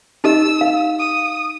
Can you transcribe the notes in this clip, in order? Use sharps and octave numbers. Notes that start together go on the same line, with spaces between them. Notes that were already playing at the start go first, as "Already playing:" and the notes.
D#4 G4 D#5 E6
F5
D#6